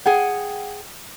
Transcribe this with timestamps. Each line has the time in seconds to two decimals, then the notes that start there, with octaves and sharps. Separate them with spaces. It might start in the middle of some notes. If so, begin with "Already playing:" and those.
0.06 G#4 F#5 G5